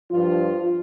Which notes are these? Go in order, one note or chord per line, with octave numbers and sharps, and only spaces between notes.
G2 F3 F4